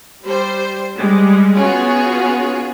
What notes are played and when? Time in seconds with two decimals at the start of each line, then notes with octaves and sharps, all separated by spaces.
0.25 G3 C5
0.97 G3 G#3
1.56 B3 C#4 F4 F#4 G#4 C#5